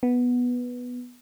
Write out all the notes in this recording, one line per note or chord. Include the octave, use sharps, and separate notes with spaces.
B3